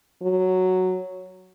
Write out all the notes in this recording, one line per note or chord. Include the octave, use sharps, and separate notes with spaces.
F#3